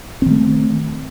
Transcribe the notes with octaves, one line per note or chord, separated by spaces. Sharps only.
D#3 A3 C4